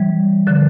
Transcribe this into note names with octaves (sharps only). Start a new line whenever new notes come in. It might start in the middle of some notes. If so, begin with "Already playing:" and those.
Already playing: E3 G3
D3 F3